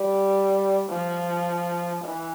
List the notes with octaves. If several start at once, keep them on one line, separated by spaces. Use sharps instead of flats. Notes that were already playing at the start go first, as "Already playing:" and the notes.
Already playing: G3
F3
E3